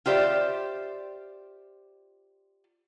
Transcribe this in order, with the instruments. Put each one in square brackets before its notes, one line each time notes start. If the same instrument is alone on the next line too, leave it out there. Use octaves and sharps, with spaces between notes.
[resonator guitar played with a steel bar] F4 G4 C5 D5 E5